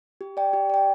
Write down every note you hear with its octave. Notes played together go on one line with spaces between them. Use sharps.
G4
D5 G5
G4
D5 G5